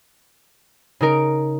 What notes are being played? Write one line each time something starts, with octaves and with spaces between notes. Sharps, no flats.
C#3 D#4 A#4 D7